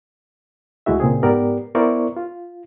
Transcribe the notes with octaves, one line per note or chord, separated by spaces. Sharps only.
D2 G#3 E4 F#4 E5
A#2 C#3 C4 G#4
G#2 B3 G4 A#4 D5
B3 E4 A#4 C5 D5 C#6
F4